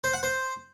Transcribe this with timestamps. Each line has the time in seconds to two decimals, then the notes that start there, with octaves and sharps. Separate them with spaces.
0.04 C5
0.13 F#5
0.23 C5